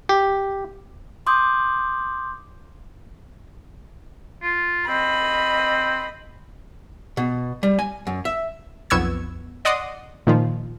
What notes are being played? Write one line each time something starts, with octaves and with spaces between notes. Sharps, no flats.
G4
C6 D6 D#6 G6
F4
C4 D#5 B5
B2
G3
G#5
F#2
E5
B1 F2 B3 C#6 E6 G#6
D5 D#5 F#5 C6 D6 D#6
A#2 D#3 F3